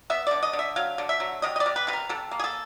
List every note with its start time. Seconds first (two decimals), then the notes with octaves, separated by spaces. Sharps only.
0.10 B3 E5
0.27 D3 D5
0.43 D#5
0.53 D3
0.59 E5
0.76 F#3 F5
0.98 D3
1.09 E5
1.20 F#3
1.42 C3 D#5
1.56 D#5
1.60 D5
1.66 C3
1.76 B4
1.87 C3 B4
1.93 A#4
2.09 C3 A4
2.31 A#3
2.39 G#4
2.44 A4